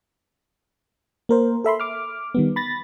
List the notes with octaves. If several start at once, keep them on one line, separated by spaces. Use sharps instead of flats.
A#3 A#4 C5
A4 E5 B5 C6
D6 F6
D#3 G3 B3
B5 A6 A#6